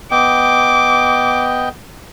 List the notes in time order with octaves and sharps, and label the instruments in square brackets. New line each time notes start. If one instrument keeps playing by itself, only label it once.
[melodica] B3 D#5 G5 [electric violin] D6